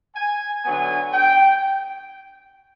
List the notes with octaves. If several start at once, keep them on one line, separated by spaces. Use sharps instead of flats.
G#5
D3 F#3 B3 G#5
G5